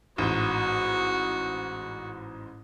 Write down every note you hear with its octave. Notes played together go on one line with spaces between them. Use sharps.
A1 G#2 F#4